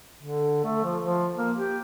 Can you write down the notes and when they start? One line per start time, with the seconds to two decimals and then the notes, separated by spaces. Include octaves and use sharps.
0.23 D3
0.64 A3
0.84 F3
1.04 F3
1.37 A#3
1.57 G4